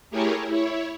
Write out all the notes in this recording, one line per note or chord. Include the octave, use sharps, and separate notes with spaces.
A3 E4 G4 G#4 A#4 C#5
E4 C#5